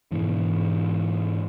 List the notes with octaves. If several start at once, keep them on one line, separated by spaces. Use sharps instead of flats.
G#2 B2 E3